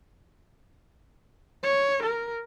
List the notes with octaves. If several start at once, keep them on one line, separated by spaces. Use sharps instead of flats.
C#5
A#4